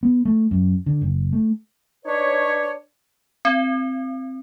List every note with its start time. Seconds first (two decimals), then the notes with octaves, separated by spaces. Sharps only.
0.03 B3
0.25 A3
0.51 F#2
0.86 D3
1.02 F#1
1.33 A3
2.04 D4 D#4 B4 C#5
3.45 C4